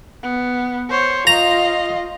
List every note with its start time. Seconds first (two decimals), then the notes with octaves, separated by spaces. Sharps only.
0.23 B3
0.89 C5 C#5
1.27 F4 D#5 A#5